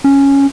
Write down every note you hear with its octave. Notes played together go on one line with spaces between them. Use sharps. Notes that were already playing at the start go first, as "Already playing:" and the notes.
C#4